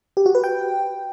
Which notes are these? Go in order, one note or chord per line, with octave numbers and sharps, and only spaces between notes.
G4
F#4
B4
G5